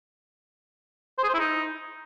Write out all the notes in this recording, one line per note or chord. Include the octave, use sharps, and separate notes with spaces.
C5
G#4
C5
E4
D#4